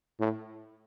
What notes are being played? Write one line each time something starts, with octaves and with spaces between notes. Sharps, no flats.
A2